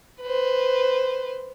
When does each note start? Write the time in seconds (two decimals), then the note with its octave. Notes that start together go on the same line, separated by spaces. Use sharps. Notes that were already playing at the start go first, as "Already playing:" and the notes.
0.22 B4 C5